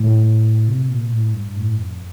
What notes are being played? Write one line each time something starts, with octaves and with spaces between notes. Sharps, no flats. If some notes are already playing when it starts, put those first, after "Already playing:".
Already playing: A2
C3
A#2
A2
G2
A2
F2